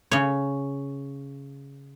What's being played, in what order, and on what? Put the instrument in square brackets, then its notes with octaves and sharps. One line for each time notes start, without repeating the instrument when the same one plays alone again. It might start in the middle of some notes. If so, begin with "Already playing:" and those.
[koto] C#3 C#5